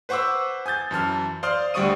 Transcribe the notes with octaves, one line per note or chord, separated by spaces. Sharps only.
B4 C5 F#5 C#6 D6 E6
G#5 D#6 G6 A6
F#2 E3 A5 F6
C5 D5 F5 C6 D#6 F6
D2 G3 D5 C#6 D#6 D#7